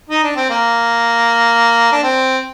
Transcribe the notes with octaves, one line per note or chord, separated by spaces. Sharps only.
D#4
D4
C4
A#3
D4
C4